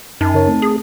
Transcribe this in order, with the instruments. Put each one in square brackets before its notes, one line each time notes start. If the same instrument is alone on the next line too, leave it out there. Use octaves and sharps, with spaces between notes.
[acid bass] F#2 [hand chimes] D#4 A5
[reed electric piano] C#3 A#4 C#5 [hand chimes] A5
[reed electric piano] A3 C4
[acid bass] G#4